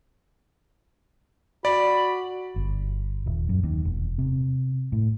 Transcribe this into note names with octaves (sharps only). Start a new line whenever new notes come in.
F#4 D5 B5
G1
D#1
F#2
D#2
E1
C3
A2